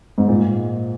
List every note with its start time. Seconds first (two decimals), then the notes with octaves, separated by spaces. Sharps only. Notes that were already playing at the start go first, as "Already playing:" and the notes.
0.18 G#2
0.28 A#2